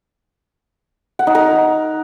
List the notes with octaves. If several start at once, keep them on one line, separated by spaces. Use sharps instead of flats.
F#5
D#4
A#4